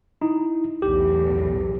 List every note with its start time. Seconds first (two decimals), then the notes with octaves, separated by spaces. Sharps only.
0.21 D#4 E4
0.82 B1 E2 A2 G4